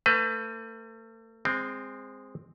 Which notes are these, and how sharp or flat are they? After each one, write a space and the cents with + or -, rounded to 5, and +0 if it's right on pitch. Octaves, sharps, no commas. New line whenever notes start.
A3 +35 B4 +25
G#3 -15 C4 +0